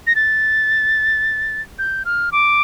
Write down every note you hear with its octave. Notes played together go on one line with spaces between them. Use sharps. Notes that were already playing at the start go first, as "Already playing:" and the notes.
A#6
A6
G6
F6
D6